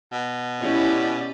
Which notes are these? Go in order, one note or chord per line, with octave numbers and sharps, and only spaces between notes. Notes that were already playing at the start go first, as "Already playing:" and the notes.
B2
C#4 E4 G4 D5 D#5